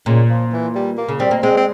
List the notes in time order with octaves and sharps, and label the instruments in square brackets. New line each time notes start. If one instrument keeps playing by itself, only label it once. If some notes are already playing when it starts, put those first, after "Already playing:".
[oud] A#2 [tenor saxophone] C#3
[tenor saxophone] F3
E3
G3
A#3
[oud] C#3
[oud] G3 [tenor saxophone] C4
[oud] A#3
[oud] G#3 [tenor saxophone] C4
[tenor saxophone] C4